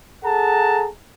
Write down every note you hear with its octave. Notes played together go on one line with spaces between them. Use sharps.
G#4 A4 F#5 A5 A#5